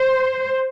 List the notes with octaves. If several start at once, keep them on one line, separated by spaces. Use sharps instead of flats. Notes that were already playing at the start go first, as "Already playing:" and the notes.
Already playing: C5